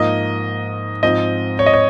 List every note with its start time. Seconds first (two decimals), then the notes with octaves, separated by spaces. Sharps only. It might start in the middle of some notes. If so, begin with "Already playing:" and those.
Already playing: G#2 F3 A#3 D#5
1.03 G#2 F3 C4 D#5
1.59 C#5
1.66 D#5
1.74 C#5